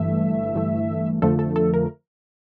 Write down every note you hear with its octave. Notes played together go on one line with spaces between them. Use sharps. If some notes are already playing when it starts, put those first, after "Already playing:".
Already playing: G1 G2 E3 A3 E5
G1 G2 E3 A3
F2 D3 F3 A3 A4
A4
A4
A#4